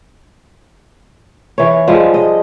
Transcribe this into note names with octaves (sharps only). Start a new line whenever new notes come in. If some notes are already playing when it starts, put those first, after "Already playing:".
E3 C#5
F3 G3 G#3
D#5